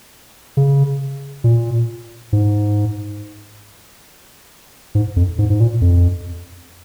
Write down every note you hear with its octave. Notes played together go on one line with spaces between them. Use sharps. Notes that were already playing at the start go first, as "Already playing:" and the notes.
C#3
A#2
G#2
G#2
F2
G#2
G#2
A#2
F2